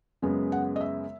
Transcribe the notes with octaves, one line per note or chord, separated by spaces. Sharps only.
F#2 C#3 G#3 B3
F#5
D#5
E5